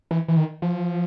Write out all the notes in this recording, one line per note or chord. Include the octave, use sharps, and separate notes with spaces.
E3
E3
D#3
F3